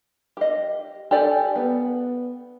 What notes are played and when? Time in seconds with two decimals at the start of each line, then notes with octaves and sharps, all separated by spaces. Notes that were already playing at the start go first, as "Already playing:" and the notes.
0.37 G4 D#5
1.11 G4 A4 D5 G#5
1.56 B3